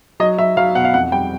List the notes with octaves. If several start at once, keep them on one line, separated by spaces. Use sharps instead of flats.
F#3 D#5
F#3 E5
F#3 F5
B2 F#5
F5
F2 F#5
G3 G5